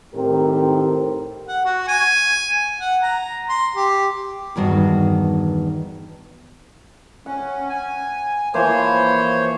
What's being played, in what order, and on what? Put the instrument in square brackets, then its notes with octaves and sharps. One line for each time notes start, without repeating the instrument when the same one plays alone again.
[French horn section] A2 D#3 C4 G4 A#4
[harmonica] F#5
F#4
G#5
F#5
A#5
C6
G4
[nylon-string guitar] E2 G2 D#3 F#4
[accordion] C#4 [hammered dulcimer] F#5
[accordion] G#5
[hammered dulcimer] E3 F3 A#3 [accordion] C5 C#5